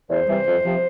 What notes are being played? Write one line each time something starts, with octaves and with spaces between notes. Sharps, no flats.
E2 C5
C3 E3 G3
F2
C3 F3